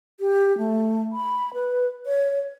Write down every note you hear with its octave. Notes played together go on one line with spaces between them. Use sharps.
G4
A3
B5
B4
C#5